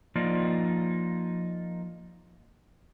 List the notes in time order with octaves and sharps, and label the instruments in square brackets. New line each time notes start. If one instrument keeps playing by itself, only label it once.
[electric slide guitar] F3 A#3 D#4 F4 D5